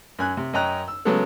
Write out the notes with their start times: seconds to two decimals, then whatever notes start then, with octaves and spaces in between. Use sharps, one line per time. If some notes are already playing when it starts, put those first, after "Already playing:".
0.19 F#2 G#5 F#6
0.37 C3
0.53 F#2 C#4 D#5 G5 A#5 F#6
0.88 E6
1.05 C#3 F#3 G#3 A3 B3 A4